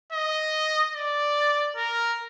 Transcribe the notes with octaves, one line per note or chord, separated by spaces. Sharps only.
D#5
D5
A#4